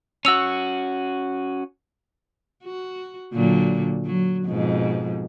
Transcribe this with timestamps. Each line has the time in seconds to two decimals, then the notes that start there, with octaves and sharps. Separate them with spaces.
0.25 C#4 F#4 E6 F7
2.64 F#4
3.34 A#2 D3 F#3
4.05 F#3
4.46 F2 G#2 B2